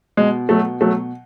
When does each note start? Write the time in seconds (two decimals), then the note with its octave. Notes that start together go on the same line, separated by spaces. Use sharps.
0.17 B2 G#3
0.49 B2 F#3 A3
0.81 B2 F#3 A3